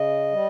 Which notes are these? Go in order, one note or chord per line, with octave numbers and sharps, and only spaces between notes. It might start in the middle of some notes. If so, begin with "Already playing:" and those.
Already playing: C#3 D#5
G3